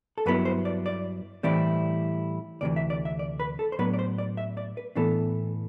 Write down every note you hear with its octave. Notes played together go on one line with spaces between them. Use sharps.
A4
G2 F#3 B3 E4 B4
C5
D5
D5
A2 E3 G3 C4 E4 D5
D2 C3 E3 D5
E5
D5
E5
D5
B4
A4
C5
A2 F#3 B3 D4 B4
D5
C5
D5
E5
D5
B4
A2 E3 B3 D4 A4